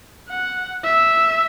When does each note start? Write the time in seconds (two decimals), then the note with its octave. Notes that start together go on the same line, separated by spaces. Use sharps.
0.29 F#5
0.84 E5